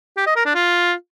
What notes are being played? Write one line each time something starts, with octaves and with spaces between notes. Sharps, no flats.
G4
D#5
A#4
D4
F4